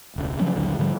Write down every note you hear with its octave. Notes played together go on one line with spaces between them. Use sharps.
E1 C#2
C#3 F3 F#3 C4
A#1 D#2 D3 F#3
G#2 D3 F3 G3